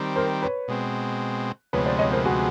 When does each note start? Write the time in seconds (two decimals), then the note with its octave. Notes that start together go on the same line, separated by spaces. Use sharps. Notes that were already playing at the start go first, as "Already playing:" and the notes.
Already playing: D#3 G3 C4
0.16 A#4 C5
0.42 B4 C#5
0.68 B2 G#3 C4
1.73 D2 C3 F3 G#3 B3 B4 C#5
1.86 C5 D5
1.99 C#5 D#5
2.12 A#4 C5
2.25 F#4 G#4